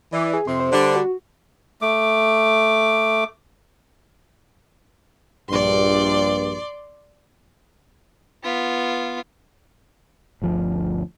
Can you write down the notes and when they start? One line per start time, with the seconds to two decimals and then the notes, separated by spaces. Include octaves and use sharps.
0.13 E3 D5
0.33 G#4
0.47 F2 C3 C6
0.60 C5
0.73 D3 G3 D4
0.96 F#4
1.82 A3 D6
5.49 A#1 G2 D5 C6
8.44 B3 F4
10.42 G1 D2 F3